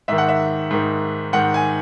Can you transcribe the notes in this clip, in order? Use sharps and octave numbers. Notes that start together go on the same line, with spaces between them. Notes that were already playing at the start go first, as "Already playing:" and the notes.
G#2 D#3 E5
F#5
E5
G#2 D#3
G#2 D#3 F#5
G#5